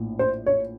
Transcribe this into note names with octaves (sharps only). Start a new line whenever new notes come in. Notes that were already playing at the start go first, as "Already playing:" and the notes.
Already playing: A#1 A2
C5
C#5